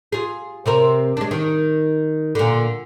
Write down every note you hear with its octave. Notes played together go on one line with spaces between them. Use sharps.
F4 G#4
C3 C4 A#4
G#3 D4
D#3
A#2 D3